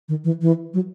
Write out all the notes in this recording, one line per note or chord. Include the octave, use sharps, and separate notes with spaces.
D#3
E3
E3
F#3